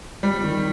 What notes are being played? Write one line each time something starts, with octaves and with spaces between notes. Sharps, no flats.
G3
D#3